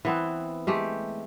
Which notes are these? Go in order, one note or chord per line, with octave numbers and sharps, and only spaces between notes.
E3 B3 C4
G#3 A3 G4